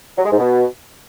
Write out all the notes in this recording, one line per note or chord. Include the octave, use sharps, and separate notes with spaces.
F#3
G#3
G#2
B2